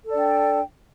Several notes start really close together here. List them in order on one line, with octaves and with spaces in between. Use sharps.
A4 D5 D4 G5